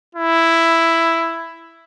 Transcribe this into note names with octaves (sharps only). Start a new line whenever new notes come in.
E4